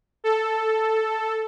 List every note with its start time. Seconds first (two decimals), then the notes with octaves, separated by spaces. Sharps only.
0.24 A4